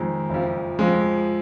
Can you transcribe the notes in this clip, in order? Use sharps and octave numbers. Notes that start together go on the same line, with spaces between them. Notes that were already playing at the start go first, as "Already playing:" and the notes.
Already playing: F2 D#3 G#3
F#1 F2 F3
F2 F3 G#3